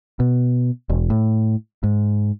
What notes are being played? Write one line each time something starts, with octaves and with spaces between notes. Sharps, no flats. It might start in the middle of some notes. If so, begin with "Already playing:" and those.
B2
E1
A2
G#2